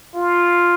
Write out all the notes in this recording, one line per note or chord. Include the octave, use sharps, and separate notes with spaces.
F4